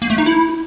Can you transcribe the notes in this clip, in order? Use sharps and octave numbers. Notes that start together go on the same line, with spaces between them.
A#3
A3
D#4
E4